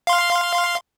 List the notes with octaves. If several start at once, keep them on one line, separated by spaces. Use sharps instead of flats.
F5 C6